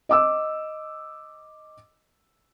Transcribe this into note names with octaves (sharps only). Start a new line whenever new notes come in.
D#5 D6 E6